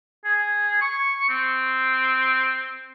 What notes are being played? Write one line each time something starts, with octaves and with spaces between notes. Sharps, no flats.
G#4
C#6
C4